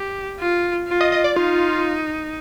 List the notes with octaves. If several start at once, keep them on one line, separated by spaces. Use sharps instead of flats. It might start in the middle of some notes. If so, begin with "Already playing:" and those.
Already playing: G4
F4
F4
D#5
D#5
D5
D#4 F4